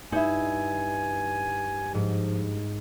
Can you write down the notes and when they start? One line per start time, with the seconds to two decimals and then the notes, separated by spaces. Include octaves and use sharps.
0.12 G2 D#4 E4 G#5
1.94 G#2 F3